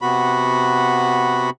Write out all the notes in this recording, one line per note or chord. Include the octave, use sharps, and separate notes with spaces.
C3 B3 F#4 B5